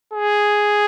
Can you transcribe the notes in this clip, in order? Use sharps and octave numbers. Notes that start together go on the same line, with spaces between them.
G#4